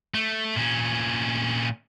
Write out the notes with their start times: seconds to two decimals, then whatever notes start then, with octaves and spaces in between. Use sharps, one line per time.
0.14 A3
0.56 A#2 C#4